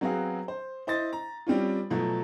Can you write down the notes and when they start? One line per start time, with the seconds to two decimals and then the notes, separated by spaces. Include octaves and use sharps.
0.01 F#3 B3 C4 F#4 G#4 F5
0.48 C5
0.87 E4 C5 D#5 A6
1.13 A#5
1.47 G3 C4 C#4 F4
1.90 B2 F3 F#3 A3